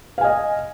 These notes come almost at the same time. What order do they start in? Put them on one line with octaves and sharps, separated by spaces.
F5 G#5 D#5